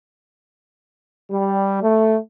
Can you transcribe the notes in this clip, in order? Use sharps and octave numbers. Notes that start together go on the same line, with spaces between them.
G3
A3